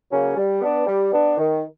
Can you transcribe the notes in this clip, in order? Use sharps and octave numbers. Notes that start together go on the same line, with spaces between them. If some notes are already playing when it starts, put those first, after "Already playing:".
C#3 F#3 A#3 C#4
G3
B3 D4
G3
B3 D4
D#3